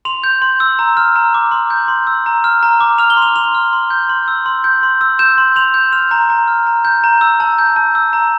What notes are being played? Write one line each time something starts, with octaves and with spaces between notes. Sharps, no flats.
C6 F7
G6
C6
E6
A#5
F6
A#5
D6
C6
G6
C6
E6
A#5
F6
A#5
D6
F6 F7
G7
C6
F7
C6 F7
F6
C6
G6
C6
E6
C6
G6
C6
E6
G6 E7
C6
C6 F7
G6
F6 F7
A#5
A#5
F6
A#5
G6
A#5
E6
A5
G6
A5
E6
A#5